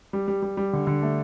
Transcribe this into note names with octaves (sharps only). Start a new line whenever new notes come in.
G3
G3
G3
G3
D3
D3
A3